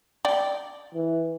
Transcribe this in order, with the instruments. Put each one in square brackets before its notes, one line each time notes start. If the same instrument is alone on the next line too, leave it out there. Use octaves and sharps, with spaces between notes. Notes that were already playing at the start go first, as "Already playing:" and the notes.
[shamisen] D5 G5
[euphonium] E3